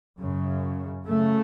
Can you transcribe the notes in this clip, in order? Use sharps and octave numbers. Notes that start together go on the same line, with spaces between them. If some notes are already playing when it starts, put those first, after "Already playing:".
F#2 C#3
F#2 C#3 A3